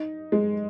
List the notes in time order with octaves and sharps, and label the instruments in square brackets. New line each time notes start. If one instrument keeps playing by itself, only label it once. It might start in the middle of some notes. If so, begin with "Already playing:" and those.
Already playing: [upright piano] D#4
G#3